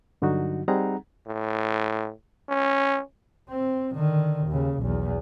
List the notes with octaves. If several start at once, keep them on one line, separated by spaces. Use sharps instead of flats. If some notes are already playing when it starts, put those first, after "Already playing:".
G2 D3 F#3 D#4 F#4
G3 C4 D#4 G#4 F#5 A#5
A2
C#4
C4
D3 D#3
D#2 C#3
B1 E2